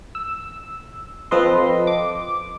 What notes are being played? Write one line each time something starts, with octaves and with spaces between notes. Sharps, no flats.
E6
F3 C4 A4 B4 D#5 C6
D6